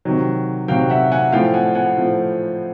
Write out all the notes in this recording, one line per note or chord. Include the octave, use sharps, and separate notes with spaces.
C3 D#3 F#3
C3 D#3 F#3 F5 G5
E5 F#5
F#5 G#5
A2 F3 F5 G5
F#5 G#5
F#5 G#5
A2 F3